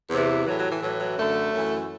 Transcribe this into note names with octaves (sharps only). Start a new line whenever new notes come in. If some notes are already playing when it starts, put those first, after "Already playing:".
E2 C3 E3
A2 E3 F#3
F#3
E3
A2 E3 F#3
F#3
F#2 D3 A3
F#2 E3